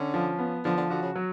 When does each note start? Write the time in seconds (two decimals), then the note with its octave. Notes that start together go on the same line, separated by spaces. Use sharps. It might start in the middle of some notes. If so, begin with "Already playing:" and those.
Already playing: D3 C#4
0.14 F3
0.39 B3
0.65 D3 F3
0.77 D3
0.90 D3 F#4
1.02 C#3
1.15 F#3